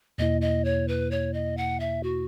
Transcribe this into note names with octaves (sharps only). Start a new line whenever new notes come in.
E2 B2 A#3 E4 D#5
D#5
C#5
B4
C#5
D#5
F#5
E5
F#4